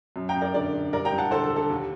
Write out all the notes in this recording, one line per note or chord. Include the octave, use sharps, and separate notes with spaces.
F#2
G5 A#5
F#2
A#4 D5
D3 A#4 D5
D3
G2 A#4 D5
G5 A#5
G2
F#5 A5
D3 A4 C5
A4
D3
A4
D#2